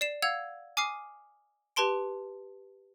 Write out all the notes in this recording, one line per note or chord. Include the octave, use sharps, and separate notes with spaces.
D5 C7 E7
F5 F#5 E6 G#6 F7
G#5 D6 D#6 F6 C7
G4 B4 A5 C6 D7